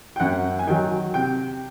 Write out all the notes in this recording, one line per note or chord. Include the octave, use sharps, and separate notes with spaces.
G5
F#2 F#5
G#5
D#3 F#3 G5
C3 G5